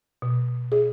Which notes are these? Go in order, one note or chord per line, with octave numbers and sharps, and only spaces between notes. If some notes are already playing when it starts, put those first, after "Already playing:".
B2
G#4